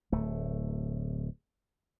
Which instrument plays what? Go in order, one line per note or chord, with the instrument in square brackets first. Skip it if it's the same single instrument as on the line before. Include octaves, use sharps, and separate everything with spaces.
[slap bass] D1 A3